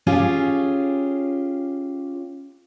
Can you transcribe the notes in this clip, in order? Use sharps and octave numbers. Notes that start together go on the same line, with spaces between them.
C#4 F4 G4 G#4